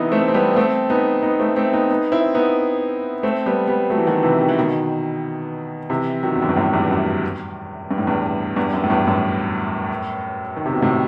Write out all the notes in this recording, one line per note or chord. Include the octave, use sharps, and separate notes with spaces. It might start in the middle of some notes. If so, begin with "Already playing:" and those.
Already playing: C3 E3 B3 D#4 E4
A3 C4
C4
G3 B3
B3
A3 C4
B3 D#4
B3 D#4
A3 C4
A3 C4
B3 D#4
B3 D#4
C4 E4
B3 D#4
A3 C4
G3 B3
G3 B3
F#3 A3
E3
D#3 F#3
C3 E3
D#3
E3
B2 D#3
C3 E3
D#3 F#3
E2
F#2
G2
F#2 A2
E2 G2
F#2
G2
A2
E2 G2
E2 G2
F#2
A2
E2 G2
F#2 A2
D#3
C3
B2
A2 C3